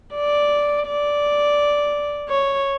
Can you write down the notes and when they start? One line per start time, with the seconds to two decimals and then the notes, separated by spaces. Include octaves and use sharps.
0.14 D5
0.86 D5
2.29 C#5